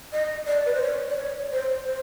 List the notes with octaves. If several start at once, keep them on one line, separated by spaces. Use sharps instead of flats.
D#5
D5
B4
C5
C#5
D5
C#5
C5
C5